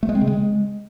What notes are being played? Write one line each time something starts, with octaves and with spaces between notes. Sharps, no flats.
A3
G#3
C4
C#3
G#3